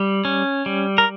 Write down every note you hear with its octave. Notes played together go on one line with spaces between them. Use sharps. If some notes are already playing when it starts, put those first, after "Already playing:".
Already playing: G3
C#4
G3
A#4